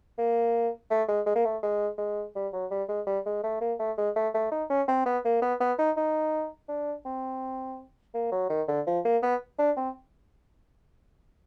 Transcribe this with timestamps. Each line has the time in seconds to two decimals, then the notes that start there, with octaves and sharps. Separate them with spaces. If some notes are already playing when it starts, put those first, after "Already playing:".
0.18 A#3
0.90 A3
1.08 G#3
1.26 G#3
1.35 A#3
1.45 A3
1.63 G#3
1.98 G#3
2.35 G3
2.53 F#3
2.71 G3
2.88 G#3
3.06 G3
3.26 G#3
3.43 A3
3.61 A#3
3.79 A3
3.98 G#3
4.16 A3
4.34 A3
4.51 D#4
4.70 C#4
4.88 C4
5.06 B3
5.25 A#3
5.42 B3
5.60 B3
5.79 D#4
5.97 D#4
6.68 D4
7.05 C4
8.14 A#3
8.32 F#3
8.50 D#3
8.68 D3
8.87 F3
9.05 A#3
9.23 B3
9.59 D4
9.77 C4